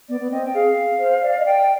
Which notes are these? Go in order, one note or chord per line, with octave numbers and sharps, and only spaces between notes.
B3 D5
B3
C4 D#5
G5
G#4 F5
C5
D5
D#5
D5 G5